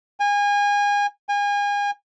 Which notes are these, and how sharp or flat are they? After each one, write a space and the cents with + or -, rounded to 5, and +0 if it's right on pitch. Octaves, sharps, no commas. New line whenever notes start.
G#5 -30
G#5 -35